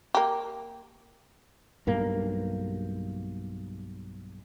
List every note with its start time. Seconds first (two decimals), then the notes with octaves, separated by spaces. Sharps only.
0.15 A#3 G4
1.87 B1 G2 A#3